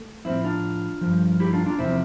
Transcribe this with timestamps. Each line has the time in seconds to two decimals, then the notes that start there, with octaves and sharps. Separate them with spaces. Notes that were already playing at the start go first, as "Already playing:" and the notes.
Already playing: A3
0.25 A2 F3 C4 E4
0.44 D4 F4
1.01 F3
1.06 G2
1.40 E4 G4
1.53 D4 F4
1.66 D4 F4
1.78 E2 C3 F3 C4 E4